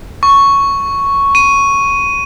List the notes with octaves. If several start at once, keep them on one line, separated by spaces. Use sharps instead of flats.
C#6
D#7